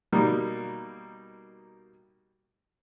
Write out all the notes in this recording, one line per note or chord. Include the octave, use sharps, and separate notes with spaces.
B2 G3 A#3 D#4